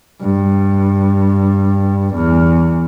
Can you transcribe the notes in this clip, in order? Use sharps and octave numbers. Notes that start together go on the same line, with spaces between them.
G2
E2